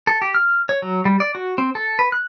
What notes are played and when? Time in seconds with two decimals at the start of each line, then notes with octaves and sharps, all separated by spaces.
0.07 A4
0.22 G4
0.34 F6
0.69 C#5
0.82 F#3
1.05 G3
1.20 D5
1.35 F#4
1.58 C4
1.75 A4
1.99 B4
2.12 F#6